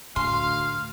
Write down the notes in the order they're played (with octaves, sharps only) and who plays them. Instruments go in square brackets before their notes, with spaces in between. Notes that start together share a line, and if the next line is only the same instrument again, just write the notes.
[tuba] D2 [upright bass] A2 [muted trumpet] F5 [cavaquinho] C6